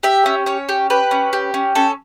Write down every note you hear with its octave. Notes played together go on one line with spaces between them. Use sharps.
G4 E5
C#4
C#4 C#5
G4
G4 B4
C#4
G4
C#4
C#4 A4